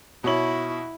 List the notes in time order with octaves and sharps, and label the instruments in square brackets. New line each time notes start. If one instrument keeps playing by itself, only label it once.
[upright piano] B2 C#5 F#7 [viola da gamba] E4